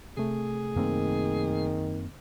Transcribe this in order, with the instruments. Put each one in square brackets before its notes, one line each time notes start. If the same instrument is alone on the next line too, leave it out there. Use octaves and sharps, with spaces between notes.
[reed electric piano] C3 A3 [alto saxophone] G#4
[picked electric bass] F#2 A#3 C4 [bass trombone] D#3